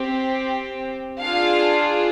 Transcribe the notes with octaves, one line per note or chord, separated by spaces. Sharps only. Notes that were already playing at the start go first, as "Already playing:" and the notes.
Already playing: C4 G4
D4 F4 G#4 F5